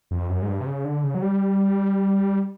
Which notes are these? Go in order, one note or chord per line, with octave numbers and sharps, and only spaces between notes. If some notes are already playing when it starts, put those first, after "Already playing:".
F2
F#2
G#2
G2
C3
C#3
D3
C#3
F#3
G3